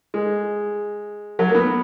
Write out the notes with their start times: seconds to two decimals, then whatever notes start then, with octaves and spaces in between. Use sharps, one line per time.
0.14 G#3
1.39 F#3
1.49 A#3
1.55 B3